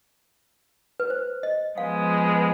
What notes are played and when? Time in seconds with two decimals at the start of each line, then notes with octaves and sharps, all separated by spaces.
1.00 B4
1.10 C5
1.43 D#5
1.78 F3 G#3 B3 F5